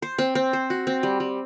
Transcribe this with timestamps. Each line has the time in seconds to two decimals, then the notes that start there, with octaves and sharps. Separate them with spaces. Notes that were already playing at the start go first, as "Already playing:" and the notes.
0.02 C5
0.18 C4
0.35 C4
0.53 C5
0.70 F#4
0.87 C4
1.03 G3
1.20 G3